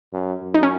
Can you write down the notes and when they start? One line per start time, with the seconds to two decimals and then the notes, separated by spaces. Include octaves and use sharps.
0.13 F#2
0.42 F#2
0.54 D#4
0.63 C#4